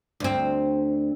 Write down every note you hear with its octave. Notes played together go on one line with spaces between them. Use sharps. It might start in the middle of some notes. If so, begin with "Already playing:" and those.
D2 C4